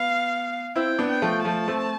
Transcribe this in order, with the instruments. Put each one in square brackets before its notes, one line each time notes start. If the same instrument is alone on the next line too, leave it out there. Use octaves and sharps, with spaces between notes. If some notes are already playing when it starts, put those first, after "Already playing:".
Already playing: [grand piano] B3 [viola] F5
[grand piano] C4 E4 [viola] G5
[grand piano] B3 D4
[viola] G5
[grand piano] F3 A3
[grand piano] F3 A3 [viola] A5
[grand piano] A3 C4